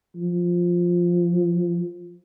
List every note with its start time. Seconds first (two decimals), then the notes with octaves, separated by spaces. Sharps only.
0.16 F3